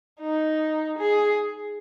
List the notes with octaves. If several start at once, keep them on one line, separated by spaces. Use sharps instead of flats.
D#4
G#4